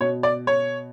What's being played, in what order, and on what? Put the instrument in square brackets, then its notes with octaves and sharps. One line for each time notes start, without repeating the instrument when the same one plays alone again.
[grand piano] B2 C#5
D5
C#5